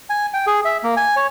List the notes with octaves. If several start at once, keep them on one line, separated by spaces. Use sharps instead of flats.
G#5
G5
G#4
E5
A#3
G#5
C#5